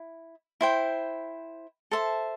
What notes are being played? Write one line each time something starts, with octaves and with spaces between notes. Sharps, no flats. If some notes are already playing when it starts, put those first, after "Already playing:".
Already playing: E4
E4 C5 G5
A4 C5 E5 A5